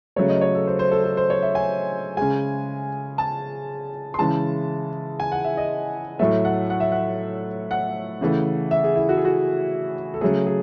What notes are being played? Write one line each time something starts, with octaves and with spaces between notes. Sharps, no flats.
C#3 F#3 A3 C#5
D#5
C#5
A4
C5
C5
A4
A4
C5
C#5
E5
G#5
C#3 G#3 G#5
A5
C6
C#3 E3 G#3 A5
G#5
F#5
E5
D#5
A2 F#3 A3 E5
F#5
F#5
E5
F#5
F#5
C#3 E3 A3
E5
G#4
E4
F#4
G#4
F#4
A4
C#3 F#3 A3 G#4
G#4